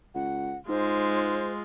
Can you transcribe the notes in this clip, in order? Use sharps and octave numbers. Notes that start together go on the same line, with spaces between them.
C#2 F#5
G#2 G#3 F4 C5